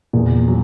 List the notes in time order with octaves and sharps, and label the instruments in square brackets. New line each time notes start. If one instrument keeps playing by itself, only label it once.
[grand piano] E2 [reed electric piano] A#2
[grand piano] F#3